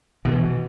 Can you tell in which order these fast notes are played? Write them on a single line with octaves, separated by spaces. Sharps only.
B2 D#3 E3